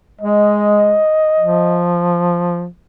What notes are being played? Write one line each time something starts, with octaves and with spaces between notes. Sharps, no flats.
G#3 D#5
F3